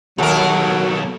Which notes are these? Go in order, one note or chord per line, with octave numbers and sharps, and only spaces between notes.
D#2 B2 F#3 F#4 A4 A#4